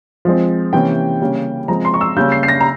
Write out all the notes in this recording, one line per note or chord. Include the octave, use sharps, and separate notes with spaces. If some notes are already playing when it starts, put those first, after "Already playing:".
F3 G#3 C4
C3 E3 A#3 C#4 G5
C#3 G3 A#3 C#4
F3 G#3 C4 A#5
C6
C#6
E6
C#3 G3 A#3 C#4 G6
C7
C7
A#6
A#5